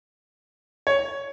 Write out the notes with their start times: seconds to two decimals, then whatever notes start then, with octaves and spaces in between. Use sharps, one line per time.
0.87 C#5